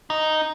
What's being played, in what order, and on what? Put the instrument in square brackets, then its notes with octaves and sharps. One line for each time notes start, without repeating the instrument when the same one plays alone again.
[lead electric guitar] D#4